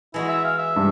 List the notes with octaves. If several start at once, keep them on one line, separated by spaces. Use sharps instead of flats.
E3 G#3 E4 F#4
E5
F5
E5
G2